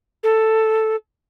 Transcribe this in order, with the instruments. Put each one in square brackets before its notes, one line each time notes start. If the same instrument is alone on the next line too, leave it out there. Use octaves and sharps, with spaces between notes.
[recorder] A4